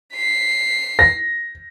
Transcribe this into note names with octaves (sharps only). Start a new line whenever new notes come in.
B6 C7
A#6